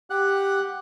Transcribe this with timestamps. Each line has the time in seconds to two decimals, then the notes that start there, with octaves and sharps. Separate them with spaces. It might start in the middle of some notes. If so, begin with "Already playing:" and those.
0.10 G4 F#5 F#6